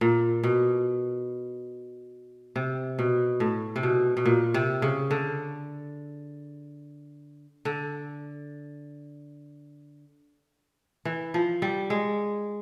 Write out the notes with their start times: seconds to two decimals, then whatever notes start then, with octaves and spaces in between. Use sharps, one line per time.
0.01 A#2
0.43 B2
2.56 C3
2.99 B2
3.40 A2
3.76 C3
3.83 B2
4.17 B2
4.25 A#2
4.54 C3
4.82 C#3
5.11 D3
7.65 D3
11.05 E3
11.34 F3
11.62 G3
11.90 G#3